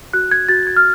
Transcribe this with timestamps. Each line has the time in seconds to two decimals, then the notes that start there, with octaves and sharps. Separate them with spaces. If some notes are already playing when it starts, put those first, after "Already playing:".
0.13 F#4 F#6
0.31 G#6
0.49 F#4 A6
0.67 G#6
0.76 F6